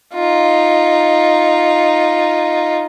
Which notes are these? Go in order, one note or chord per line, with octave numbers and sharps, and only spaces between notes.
D#4 F4